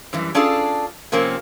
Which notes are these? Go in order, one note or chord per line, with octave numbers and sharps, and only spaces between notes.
F#2 E3 G3
C#4 D4 F4 G#4 A4
C3 F3 A#3 C4 C#4